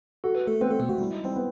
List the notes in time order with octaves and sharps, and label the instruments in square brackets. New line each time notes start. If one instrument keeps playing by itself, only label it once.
[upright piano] F#4 [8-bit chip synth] A4
[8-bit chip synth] B4
A3 A4
[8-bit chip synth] B3 B4 [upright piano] C4
[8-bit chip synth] A3 A4
B2 B3
[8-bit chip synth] A3 [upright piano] F#4
[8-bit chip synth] G3 [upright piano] E4
[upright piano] D#4
[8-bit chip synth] G3 [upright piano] C4
[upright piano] B3